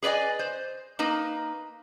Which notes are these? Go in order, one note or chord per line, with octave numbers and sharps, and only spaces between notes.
G#4 B4 D5 D#5 G#5
C5
A#3 D#4 B4